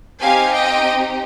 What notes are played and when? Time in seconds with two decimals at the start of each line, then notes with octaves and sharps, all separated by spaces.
0.21 C4 D#4 G4 F5 G#5
0.54 D#5 G5